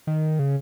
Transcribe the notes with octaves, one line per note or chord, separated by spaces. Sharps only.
D#3
C#3